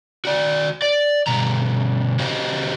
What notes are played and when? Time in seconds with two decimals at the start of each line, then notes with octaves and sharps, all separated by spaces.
0.25 F#4 D5
0.82 D5
1.27 G2 B2 A#5
2.19 F#4 G4 C5 D#5 F5